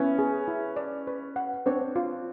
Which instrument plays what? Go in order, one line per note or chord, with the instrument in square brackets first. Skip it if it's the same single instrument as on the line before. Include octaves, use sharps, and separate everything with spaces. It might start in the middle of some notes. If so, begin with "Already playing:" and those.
Already playing: [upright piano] B3 C#4 [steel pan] E4
[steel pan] G#4
E4
D5
B4
F#5
[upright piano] C4 D4 [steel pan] C#5
[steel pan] F4